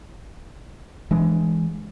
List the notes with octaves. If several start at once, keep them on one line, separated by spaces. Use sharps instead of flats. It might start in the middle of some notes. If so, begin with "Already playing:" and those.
E3 G#3 D4